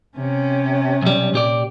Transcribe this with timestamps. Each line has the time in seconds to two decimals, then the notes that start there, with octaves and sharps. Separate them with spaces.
0.17 C3 C#4
1.02 B1 G3
1.33 A#2 G4 D5